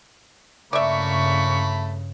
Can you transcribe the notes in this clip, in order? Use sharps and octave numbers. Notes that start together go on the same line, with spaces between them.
G2 C#3 A3 A#3 D5 E5 B5 C#6